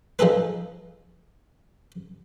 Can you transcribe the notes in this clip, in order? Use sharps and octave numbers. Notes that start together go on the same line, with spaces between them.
F3 D#4 G#4 A4 B4